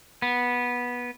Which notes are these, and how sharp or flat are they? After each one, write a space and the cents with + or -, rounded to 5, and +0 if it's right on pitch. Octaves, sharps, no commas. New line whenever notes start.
B3 -15